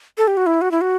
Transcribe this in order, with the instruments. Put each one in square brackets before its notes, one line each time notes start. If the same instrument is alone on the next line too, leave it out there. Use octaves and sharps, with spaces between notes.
[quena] A4
G4
F#4
E4
F#4
E4
F#4